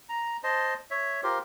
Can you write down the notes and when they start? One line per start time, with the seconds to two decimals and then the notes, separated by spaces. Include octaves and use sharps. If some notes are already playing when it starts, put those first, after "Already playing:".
0.09 A#5
0.44 C5 D#5 A5
0.91 C#5 E5
1.23 F4 G4 A#4 C5